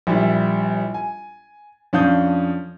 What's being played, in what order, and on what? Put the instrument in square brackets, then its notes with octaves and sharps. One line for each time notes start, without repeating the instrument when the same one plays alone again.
[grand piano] A#1 G3 E4
G#5
F2 C#4 D4 F5 D#6 G6